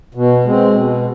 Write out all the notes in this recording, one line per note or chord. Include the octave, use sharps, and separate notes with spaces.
B2
G#3 C4
B2